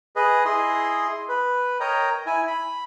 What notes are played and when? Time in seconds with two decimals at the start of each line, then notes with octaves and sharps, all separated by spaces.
0.16 G#4 B4 D#5
0.45 E4 G#4 D#5 C6
1.29 B4
1.80 A#4 C#5 D#5 G5 A#5
2.26 E4 G#5
2.48 B5